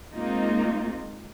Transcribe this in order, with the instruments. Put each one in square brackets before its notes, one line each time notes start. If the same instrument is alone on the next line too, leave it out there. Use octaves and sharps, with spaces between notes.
[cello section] G#3 A#3 C4 D#4 F4